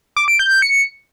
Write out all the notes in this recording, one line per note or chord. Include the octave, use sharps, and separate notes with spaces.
D6
D7
G6
G6
C#7